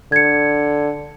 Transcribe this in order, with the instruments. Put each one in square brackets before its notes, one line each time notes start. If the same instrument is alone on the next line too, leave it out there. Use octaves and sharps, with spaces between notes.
[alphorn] D3 [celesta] G#6 C#7